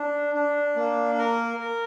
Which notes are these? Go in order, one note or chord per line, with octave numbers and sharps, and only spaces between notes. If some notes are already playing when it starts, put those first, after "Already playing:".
Already playing: D4
D4
A#3
A#4
A#4